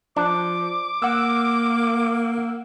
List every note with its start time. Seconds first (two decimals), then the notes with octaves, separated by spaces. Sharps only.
0.17 F3 D4 D6
1.02 A#3 F#5 E6